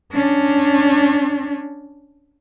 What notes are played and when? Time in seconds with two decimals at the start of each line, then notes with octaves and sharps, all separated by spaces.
0.12 C#4 D4